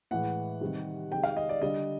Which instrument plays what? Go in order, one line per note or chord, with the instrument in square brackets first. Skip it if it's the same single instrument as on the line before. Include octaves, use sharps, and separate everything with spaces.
[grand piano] A2 E3 G#3 F#5
C3 D#3 G3
C3 D#3 G#3 G5
F5
D#5
D5
D3 G3 D#5